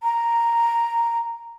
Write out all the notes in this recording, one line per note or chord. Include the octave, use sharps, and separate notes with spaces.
A#5